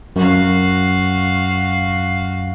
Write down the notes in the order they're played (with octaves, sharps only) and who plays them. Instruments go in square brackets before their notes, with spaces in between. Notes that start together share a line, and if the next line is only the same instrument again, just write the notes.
[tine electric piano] F#2 [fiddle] F#4 F5